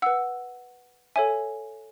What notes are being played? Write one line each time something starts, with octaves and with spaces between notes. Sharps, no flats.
B4 F#5 E6
A4 C#5 E5 G#5